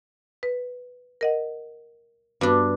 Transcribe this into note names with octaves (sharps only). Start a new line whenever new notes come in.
B4
A#4 D#5 F#5
G2 B3 D4 F#4